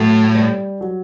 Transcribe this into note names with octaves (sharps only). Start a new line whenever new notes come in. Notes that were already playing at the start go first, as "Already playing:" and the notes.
Already playing: A2 F#3 A3
G3
F#3